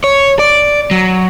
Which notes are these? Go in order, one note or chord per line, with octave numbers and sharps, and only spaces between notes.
C#5
D5
F#3